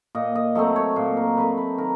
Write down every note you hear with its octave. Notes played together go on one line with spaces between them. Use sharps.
A#2 D#5
D#5
F#3 A3 C4 D#5
C#5
A#2 C5
A#4
F#3 A3 C4 B4
B4
D#3 A#4